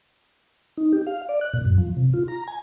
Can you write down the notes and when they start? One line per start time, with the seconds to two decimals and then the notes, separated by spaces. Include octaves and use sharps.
0.77 D#4
0.93 G4
1.07 F5
1.29 D5
1.41 F#6
1.53 A#2
1.65 F#2
1.78 F3
1.97 C3
2.14 F4
2.28 A#5
2.47 G#5